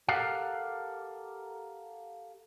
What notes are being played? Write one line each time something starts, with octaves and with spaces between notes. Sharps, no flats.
G4 A4 A#4 F5 F#5